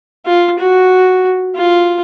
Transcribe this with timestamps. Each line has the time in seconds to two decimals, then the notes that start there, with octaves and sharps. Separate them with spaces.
0.26 F4
0.59 F#4
1.56 F4